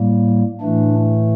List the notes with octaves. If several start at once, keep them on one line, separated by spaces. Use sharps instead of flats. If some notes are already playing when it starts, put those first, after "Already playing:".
Already playing: A2 G3 A#3
A2 E3 A3 D4